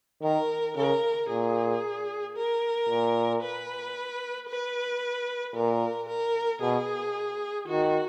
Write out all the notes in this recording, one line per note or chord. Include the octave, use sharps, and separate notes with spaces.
D#3 A#4
C#3 A#4
A#2 G#4
A#4
A#2
B4
B4
A#2 A#4
A#4
B2 G#4
D#3 F#4